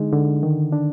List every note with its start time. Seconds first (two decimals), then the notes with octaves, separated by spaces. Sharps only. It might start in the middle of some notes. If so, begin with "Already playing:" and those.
Already playing: D3 G#3 D#4
0.12 D3
0.43 D#3
0.72 D4